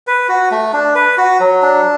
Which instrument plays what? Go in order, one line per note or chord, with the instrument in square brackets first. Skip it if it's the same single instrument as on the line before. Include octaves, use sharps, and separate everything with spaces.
[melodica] B4
F#4
A3
D4
B4
F#4
F#3
D4